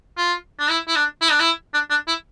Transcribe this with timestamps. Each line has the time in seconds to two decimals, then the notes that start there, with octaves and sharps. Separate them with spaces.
0.17 F4
0.59 D4
0.70 E4
0.88 E4
0.96 D4
1.21 E4
1.31 D4
1.40 E4
1.74 D4
1.90 D4
2.08 E4